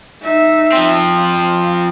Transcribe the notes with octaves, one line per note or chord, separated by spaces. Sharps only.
D#4 E5
F3 C4
F5